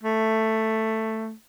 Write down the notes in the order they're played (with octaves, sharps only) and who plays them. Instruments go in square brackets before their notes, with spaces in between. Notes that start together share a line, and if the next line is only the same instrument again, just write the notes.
[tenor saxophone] A3